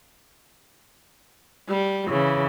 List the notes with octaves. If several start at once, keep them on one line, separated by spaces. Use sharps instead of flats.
G3
C#3 E3